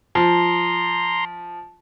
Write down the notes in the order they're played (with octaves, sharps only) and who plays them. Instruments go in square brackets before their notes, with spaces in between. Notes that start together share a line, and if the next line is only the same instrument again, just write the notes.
[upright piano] F3 [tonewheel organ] A#5 C6